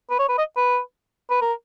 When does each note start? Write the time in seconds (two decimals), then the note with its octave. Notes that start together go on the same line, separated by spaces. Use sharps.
0.10 B4
0.19 C#5
0.29 B4
0.38 D#5
0.57 B4
1.30 B4
1.42 A#4